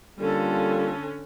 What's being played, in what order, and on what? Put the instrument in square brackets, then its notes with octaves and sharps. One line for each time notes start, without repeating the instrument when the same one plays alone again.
[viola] D3 C#4 [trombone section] G3 A#3 F4 [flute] A4